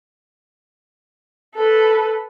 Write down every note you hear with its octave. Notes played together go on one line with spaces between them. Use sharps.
A4 B4